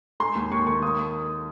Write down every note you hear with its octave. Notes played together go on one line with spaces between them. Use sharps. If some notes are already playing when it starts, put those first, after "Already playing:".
G#3 C6
D#2
D#2 C#6
D#3 C#6
A#3 D#6